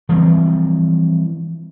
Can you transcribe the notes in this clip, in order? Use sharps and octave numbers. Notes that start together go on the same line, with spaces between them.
E3 F3 G3 C4